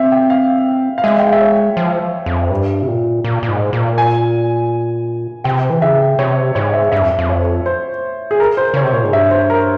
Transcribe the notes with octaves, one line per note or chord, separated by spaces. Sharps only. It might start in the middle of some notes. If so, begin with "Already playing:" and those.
Already playing: C4 E5 F5
G5
F5
F5
G#3 E5
G5
F5
E5
C#5
F3
F2
G2
C3
A#2
A#2
A#2
G#2
A#2
G#5
C3 G5
E3
C#3 E5
C3 C#5
G#2 C#5
E5
G2 E5
F2
F2
C#5
C5
G#4
A#4
C5
C#3 C#5
C3
A#2 C#5
G#2
G2 E5
C5
A#4